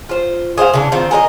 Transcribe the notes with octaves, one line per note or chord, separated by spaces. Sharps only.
F4 C5
G#4 C5 D#5 F5
C#3 E3 D4
D#3 C4 F4
G#4 A#4 B4 D#5